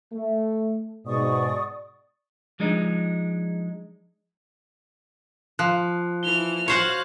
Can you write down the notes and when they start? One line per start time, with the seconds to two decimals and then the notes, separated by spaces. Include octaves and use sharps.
0.13 A3
1.07 G#2 B2 D5 C#6 D#6
2.60 F3 G#3 D4 D#4
5.59 F3 F#6
6.23 E3 F6 G7
6.68 F#4 C5 C#5 F5 F#6